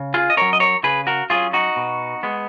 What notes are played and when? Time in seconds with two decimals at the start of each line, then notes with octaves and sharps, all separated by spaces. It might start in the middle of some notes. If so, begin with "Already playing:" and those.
Already playing: C#3
0.14 F4 G#4
0.30 D#5
0.37 F#3 C#4 A#4 C#5
0.53 D#5
0.60 A#4 C#5
0.84 C#3 G#4 B4
1.07 F#4 A#4
1.30 F#3 C#4 F4 G#4
1.53 D#4 F#4
1.76 B2
2.23 G#3 B3